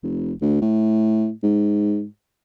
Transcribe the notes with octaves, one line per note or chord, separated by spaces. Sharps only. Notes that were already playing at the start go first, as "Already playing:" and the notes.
F1
D2
A2
G#2